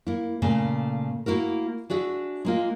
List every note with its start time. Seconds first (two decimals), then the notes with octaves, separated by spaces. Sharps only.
0.07 A#3 E4
0.42 A#2 C#3 A3 A#3
1.26 A#3 E4 F#4 A#4
1.90 D4 F#4 G#4 E5
2.45 G#3 A#3 F4